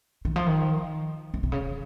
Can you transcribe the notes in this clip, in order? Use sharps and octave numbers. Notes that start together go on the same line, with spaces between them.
D#3
F3
D#3
C#3
C3
C#3